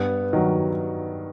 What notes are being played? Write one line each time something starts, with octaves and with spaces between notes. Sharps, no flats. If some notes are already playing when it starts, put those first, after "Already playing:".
Already playing: G2 B3
D#3 F#3